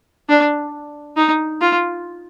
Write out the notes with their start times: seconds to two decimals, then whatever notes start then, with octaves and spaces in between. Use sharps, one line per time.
0.29 D4
1.17 D#4
1.61 F4